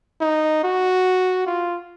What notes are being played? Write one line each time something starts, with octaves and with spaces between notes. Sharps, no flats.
D#4
F#4
F4